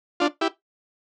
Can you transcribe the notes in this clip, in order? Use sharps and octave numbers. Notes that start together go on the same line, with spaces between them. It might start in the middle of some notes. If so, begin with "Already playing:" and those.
D4 F4
E4 G4